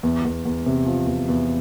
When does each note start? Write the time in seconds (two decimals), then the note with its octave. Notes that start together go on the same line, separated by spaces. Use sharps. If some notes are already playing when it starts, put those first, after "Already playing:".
0.03 E2
0.25 E2
0.45 E2
0.66 C3
0.86 F3
1.07 E2
1.29 E2